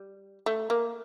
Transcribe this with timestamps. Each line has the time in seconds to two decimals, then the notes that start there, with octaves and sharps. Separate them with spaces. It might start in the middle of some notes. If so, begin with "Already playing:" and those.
Already playing: G3
0.46 A3
0.70 A#3